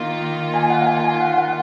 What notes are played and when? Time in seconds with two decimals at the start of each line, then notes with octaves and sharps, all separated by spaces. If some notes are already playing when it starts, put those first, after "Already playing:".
Already playing: D#3 A#3 F4
0.54 G#5
0.70 F#5
0.82 F#5
0.87 G#5
1.04 G#5
1.20 F#5
1.38 F#5